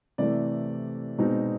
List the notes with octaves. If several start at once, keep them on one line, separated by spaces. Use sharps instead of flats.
C3 E3 A3 D5
B2 G#3 C4 D#4